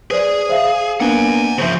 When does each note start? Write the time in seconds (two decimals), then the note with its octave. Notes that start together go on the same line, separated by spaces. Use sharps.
0.11 G#4 B4 C5 D5
0.49 C5 E5 F5
1.00 A#3 B3 D4 F#5 G#5
1.58 C#3 F3 C5 E5